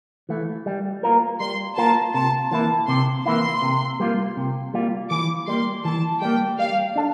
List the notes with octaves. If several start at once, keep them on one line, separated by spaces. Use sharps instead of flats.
E3 A3
G3
A#3 F4 A#4
G3 C6
A#3 F4 A#4 A5
C3 A5
E3 A#3 E4 A5
C3 C6
E3 A#3 E4 C6
C3
G3 A#3 F4
C3
G3 A#3 F4
E3 D6
G3 A#3 C6
E3 A5
G3 A#3 G5
G3 F5
D4 A4